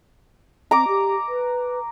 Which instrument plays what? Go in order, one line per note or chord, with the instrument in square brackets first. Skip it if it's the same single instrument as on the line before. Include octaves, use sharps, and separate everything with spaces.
[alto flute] C4 [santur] A#5 D6
[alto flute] G4
B4